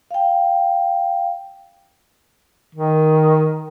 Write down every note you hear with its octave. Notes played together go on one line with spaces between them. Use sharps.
F5 G5
D#3